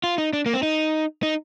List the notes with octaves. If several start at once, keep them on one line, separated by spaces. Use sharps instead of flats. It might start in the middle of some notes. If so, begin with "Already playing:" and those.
F4
D#4
D4
A#3
C4
D#4
D#4